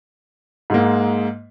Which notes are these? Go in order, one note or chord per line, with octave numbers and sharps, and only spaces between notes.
G#2 G#3 A#3